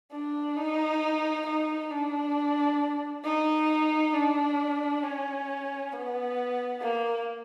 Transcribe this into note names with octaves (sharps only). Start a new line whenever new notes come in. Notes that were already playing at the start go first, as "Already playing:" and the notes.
D4
D#4
D#4
D4
D#4
D4
C#4
B3
A#3